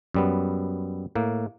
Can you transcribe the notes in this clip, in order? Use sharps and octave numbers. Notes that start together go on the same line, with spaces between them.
F#2 G3 B3
A2 A#3